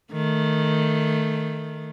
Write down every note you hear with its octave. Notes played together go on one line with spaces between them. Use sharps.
D#3 A3